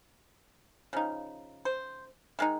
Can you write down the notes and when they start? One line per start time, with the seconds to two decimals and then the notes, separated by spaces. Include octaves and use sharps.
0.93 C#3 F3 D#4
1.65 C5
2.39 D#3 G#3 D#4